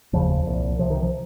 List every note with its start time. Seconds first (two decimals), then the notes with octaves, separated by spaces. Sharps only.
0.13 F1 D#2 C#3 F3
0.46 C2 A#2
0.79 C2 C3 F3
0.90 D#3
1.02 F3